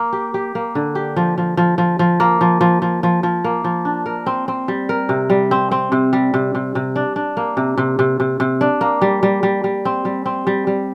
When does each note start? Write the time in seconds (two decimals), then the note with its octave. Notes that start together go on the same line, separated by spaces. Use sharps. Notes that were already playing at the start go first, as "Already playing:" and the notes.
Already playing: A#3
0.13 G4
0.34 G4
0.55 A#3
0.75 D3
0.95 G4
1.16 F3
1.38 F3
1.57 F3
1.78 F3
1.99 F3
2.20 A#3
2.41 F3
2.61 F3
2.82 F3
3.03 F3
3.23 F3
3.44 A#3
3.64 F3
3.85 D4
4.06 A#4
4.26 C4
4.48 C4
4.68 G3
4.89 A#4
5.09 C3
5.30 G3
5.51 C4
5.71 C4
5.92 C3
6.13 G3
6.34 C3
6.55 C3
6.75 C3
6.96 D4
7.16 D4
7.37 A#3
7.57 C3
7.78 C3
7.99 C3
8.20 C3
8.40 C3
8.61 D4
8.81 A#3
9.02 G3
9.23 G3
9.43 G3
9.64 G3
9.85 C4
10.05 G3
10.26 C4
10.47 G3
10.67 G3